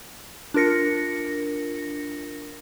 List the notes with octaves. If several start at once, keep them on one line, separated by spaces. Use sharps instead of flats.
D4 F4 A#4 A#6 C#7